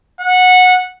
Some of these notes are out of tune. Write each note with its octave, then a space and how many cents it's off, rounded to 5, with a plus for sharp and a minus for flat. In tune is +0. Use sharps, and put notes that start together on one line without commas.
F#5 -15